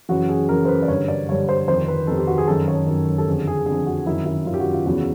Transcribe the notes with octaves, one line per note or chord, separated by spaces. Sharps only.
F#2 C#3 E3 F#4
G#4
F#2 C#3 E3 A#4
C5
B4
D5
G2 D3 C#5
D5
G2 D3 C#5
C5
F2 C3 D#3 C5
B4
F2 C3 D#3 A4
G4
F#4
G#4
F#2 D#3 A4
C#5
F#2 D#3
A4
F2 D3 G#4
G#4
F2 D3 G#4
F#4
F#2 D#3 E4
E4
F#2 D#3 F4
G4
F#4
F4
E2 C#3 E3 F#4